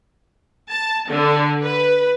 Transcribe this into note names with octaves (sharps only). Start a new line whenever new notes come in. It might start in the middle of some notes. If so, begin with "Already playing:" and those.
A5
D3
B4